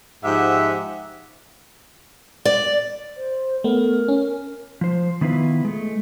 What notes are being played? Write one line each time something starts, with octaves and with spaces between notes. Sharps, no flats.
G#2 F3 G4 E5 F#5
D5
C5
A3 B3 A#4
C#4
F3 C5
D#3 B3 E4 F4 B4
G#3 A3